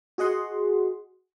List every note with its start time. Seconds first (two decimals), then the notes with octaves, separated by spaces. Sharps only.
0.18 F#4 G#4 D#5 F#5 C6